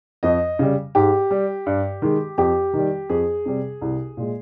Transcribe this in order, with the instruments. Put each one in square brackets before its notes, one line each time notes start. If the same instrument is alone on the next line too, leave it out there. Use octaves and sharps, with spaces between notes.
[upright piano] F2 D#5
C#3 G3
G#2 G4
G3
G2
D#3 G#3
F2 G4
D#3 G3
F2 G#4
C3 G3
C2
A#2 G#3